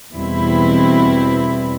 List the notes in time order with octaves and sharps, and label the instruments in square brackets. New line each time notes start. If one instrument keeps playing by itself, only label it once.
[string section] E2 B2 G3 C4 E4